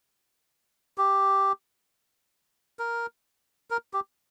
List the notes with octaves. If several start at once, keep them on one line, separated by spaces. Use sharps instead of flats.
G4
A#4
A#4
G4